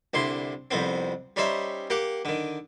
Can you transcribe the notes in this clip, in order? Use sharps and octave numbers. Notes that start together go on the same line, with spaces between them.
C2 D3 E4 C6
C2 F2 B3 C4
G3 C#4 D#4 C5 E5
A#3 G4 F#5
D3 D#3